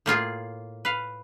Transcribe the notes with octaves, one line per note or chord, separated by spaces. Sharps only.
A2 A#3 F4 G#4
B4 F5